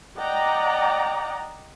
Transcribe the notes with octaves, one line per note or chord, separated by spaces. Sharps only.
D5 D#5 F#5 G5 A#5